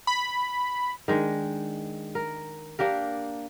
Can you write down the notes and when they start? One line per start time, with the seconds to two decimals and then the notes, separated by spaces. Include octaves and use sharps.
0.07 B5
1.08 D#3 G#3 D4
2.15 A#4
2.79 A#3 D4 G4 A#4